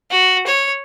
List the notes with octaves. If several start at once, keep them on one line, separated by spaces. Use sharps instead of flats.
F#4
C#5